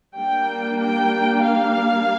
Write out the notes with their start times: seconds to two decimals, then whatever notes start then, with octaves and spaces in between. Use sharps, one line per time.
0.15 G3 A#3 D4 G5
0.79 G5
1.43 F5